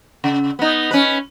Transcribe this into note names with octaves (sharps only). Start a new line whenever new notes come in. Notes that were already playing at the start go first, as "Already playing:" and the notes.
C#3
B3 D#4
C#4 B4